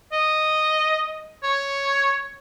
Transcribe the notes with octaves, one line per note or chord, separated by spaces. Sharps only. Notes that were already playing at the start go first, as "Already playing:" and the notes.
D#5
C#5